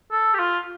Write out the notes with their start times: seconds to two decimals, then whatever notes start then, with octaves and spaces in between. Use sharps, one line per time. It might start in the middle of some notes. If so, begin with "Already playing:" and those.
0.12 A4
0.34 G4
0.39 F4